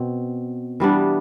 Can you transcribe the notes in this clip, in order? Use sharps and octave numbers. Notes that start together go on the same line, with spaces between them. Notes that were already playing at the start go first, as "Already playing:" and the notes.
Already playing: B2 C4
E3 G3 B3 D4